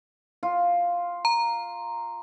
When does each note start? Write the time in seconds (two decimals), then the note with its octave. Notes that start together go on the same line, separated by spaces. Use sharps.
0.43 F4
1.25 A#5